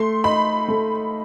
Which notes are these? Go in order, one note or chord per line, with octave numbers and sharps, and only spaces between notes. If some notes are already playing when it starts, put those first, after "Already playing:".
Already playing: A3 C6
D#4 B5
A3